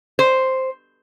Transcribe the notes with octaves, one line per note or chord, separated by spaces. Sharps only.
C5